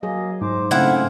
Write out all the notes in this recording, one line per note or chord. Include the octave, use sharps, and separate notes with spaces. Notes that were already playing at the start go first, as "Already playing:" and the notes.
F#3 A#3 G#4 D#5
G#2 C5 D6
C#3 A3 C4 E4 C5 F5 F#5 G#5